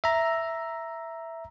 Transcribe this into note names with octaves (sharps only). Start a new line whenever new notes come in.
E5 A#5